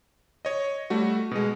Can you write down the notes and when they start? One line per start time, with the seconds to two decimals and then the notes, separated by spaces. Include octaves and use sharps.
0.45 C#5 D#5
0.90 G3 A3 F#4
1.31 B2 G#3